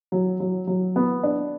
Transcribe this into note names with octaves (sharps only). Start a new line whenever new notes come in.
F#3
F#3
F#3
B3
D4